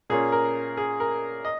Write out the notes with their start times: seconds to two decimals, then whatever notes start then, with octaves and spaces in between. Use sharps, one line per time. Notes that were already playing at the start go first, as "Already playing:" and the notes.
0.10 A#2 A#3 C#4 F4 G#4
0.32 A#4
0.77 G#4
1.00 A#4
1.45 D#5